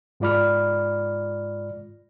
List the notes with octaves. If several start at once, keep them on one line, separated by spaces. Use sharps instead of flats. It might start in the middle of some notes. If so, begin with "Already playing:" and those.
G#2 G#3 F4 D5 B5 F6